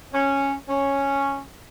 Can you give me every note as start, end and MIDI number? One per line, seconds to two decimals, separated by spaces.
0.13 0.53 61
0.69 1.43 61